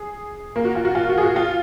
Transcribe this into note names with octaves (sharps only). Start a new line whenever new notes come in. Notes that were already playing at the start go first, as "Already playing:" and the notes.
Already playing: G#4
A#3
F#4
F4
F#4
F4
F#4
G#4
F#4
F4